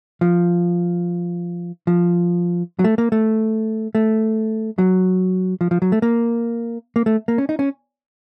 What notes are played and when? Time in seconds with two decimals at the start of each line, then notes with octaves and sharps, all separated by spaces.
0.21 F3
1.87 F3
2.79 F#3
2.84 A3
2.98 A#3
3.12 A3
3.95 A3
4.78 F#3
5.61 F3
5.71 F3
5.82 F#3
5.92 A3
6.02 A#3
6.96 A#3
7.06 A3
7.28 A#3
7.38 C#4
7.49 D#4
7.59 C#4